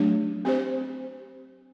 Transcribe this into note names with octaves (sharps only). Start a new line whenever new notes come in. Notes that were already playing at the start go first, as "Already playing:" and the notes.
Already playing: F#3 A3 D4 G4
C4 G4 C5